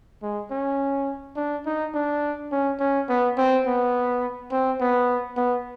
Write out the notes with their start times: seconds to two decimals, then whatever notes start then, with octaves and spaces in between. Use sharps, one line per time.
0.23 G#3
0.51 C#4
1.37 D4
1.66 D#4
1.94 D4
2.52 C#4
2.80 C#4
3.09 B3
3.38 C4
3.67 B3
4.52 C4
4.80 B3
5.37 B3